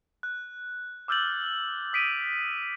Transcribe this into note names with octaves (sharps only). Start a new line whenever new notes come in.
F#6
D6 E6 F6 G6 A6 F#7
D#6 B6 D7 D#7